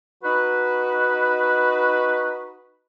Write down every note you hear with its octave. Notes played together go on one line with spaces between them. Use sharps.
D#4 F#4 B4